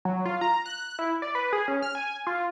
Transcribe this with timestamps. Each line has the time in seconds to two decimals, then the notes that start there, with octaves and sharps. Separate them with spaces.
0.05 F#3
0.25 F4
0.41 A#5
0.66 F#6
0.99 E4
1.22 D5
1.35 B4
1.53 G#4
1.68 C#4
1.83 F6
1.95 G#5
2.27 F4